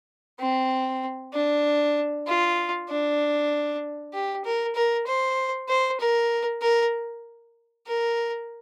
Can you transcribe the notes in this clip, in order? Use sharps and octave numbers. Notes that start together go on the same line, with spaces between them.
C4
D4
F4
D4
G4
A#4
A#4
C5
C5
A#4
A#4
A#4